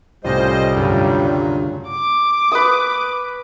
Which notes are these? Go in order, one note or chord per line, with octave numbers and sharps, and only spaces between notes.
C2 A2 G3 C#4 F4 C5 D#5 G#5
D2 G2 C#3 F#3 F4
D6
B4 C#6 D#6